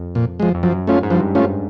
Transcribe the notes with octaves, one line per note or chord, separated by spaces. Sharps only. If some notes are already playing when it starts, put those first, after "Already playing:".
Already playing: F2
A#2
F3 G#3
F2
F#2 F3
A3 C#4 F4
G#2
G2 F3
A3 C#4 F4